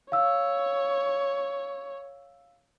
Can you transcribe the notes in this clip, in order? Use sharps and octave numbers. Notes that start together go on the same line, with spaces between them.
C#5 F5 E6